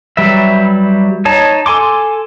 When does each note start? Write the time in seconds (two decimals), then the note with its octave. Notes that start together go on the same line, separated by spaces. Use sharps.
0.17 F#3 G3 B4 E5
1.25 D#4 C#5 A5
1.66 A4 G#5 C6 D6